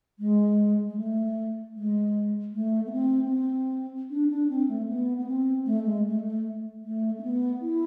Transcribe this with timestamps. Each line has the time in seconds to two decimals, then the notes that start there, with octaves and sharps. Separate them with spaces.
0.19 G#3
0.88 G#3
0.97 A3
1.75 G#3
2.53 A3
2.86 B3
2.92 C4
3.26 B3
3.31 C4
4.10 D4
4.30 D4
4.49 C4
4.68 A3
4.88 B3
5.18 B3
5.27 C4
5.66 A3
5.85 G#3
6.06 A3
6.25 A3
6.83 A3
7.18 C4
7.23 B3
7.61 E4